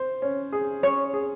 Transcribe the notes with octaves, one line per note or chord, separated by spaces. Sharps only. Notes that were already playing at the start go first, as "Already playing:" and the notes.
Already playing: C5
C#4
G#4
C#4 C#5
G#4